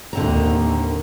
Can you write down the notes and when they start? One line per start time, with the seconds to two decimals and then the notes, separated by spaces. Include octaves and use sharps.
0.13 D#2 A2 D3 C4 A#5